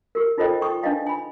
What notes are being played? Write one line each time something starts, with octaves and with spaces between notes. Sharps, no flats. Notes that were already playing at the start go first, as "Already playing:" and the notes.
G4 A#4
D#4 F4 A4 C5 D#5 G5
G5 C#6 D#6
D4 D#4 B4 D#5 F5 G5
G#5 B5